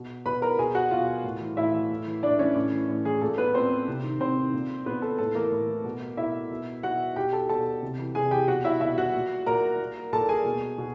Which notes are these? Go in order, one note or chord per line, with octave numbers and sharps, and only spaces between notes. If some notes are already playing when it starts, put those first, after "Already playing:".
Already playing: B2
B2 B4 B5
A#4 A#5
B2 G#4 G#5
F#4 F#5
B2 F4 F5
A2
E3
A2 E4 E5
E3
A2
E3
A2 D4 D5
E3 C#4 C#5
A2
E3
A2
E3 G#4
A#2 A4
B3 B4
A#2 C4 C5
C3
D#3
C3 C4 C5
D#3
A#2
A#2 B3 B4
A4
A2 A4
E3 A#3 A#4
A2
E3
B2
B2 E4 E5
B2
B2 F#4 F#5
B2 G4 G5
A4 A5
B2 A4 A5
C3
E3
C3 G#4 G#5
E3 G4 G5
B2 F#4 F#5
E4 E5
B2 E4 E5
F#4 F#5
A#2
A#2 A#4 A#5
A#2
A#2 A4 A5
G#4 G#5
B2
B2